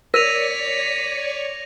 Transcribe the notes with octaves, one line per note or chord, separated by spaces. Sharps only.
A#4 C#5 D5 C#6 A#6 B6 D#7 F7